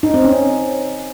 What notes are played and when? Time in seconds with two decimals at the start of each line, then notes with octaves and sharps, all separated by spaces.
0.03 D#4
0.14 C4
0.25 C#4